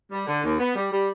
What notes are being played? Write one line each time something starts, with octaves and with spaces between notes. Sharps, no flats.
G3
D3
D#2
B3
G3
G3